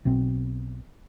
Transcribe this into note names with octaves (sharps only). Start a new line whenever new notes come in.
B1 B2 C4